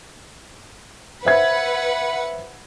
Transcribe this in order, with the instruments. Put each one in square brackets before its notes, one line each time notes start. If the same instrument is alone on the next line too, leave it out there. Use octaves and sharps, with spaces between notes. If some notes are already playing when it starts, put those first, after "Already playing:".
[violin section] B4 F#5 [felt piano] C5 E5 G#6